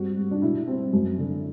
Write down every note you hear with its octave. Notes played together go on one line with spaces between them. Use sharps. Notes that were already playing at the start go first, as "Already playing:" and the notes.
Already playing: G2 C4 F#4
G2
D4
B2 E4
C4
F#2
D3